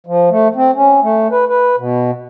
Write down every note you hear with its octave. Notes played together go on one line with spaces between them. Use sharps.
F3
A3
C4
C#4
A3
B4
B4
B2